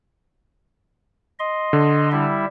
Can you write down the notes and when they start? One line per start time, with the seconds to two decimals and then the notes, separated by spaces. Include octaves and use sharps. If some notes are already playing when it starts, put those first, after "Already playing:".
1.39 D#5 C6
1.73 D3
2.12 G3 E4 E5